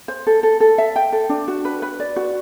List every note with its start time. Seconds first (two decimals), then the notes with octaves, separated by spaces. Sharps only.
0.08 C5
0.27 A4
0.43 A4
0.60 A4
0.78 E5
0.96 G5
1.12 A4
1.29 D4
1.48 F#4
1.65 B4
1.82 B4
2.00 D5
2.16 F#4